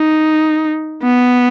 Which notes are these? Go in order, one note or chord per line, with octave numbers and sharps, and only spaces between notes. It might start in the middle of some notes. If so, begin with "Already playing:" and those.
Already playing: D#4
B3